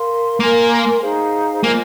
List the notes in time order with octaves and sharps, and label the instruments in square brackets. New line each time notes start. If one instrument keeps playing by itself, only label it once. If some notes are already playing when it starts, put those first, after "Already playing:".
Already playing: [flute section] A#4 F5 C6
[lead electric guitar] A#3 [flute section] A#4 G#5 C6
[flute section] D#4 G#4 C5 F5
[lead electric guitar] A#3 [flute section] F4 C5 D#5 G#5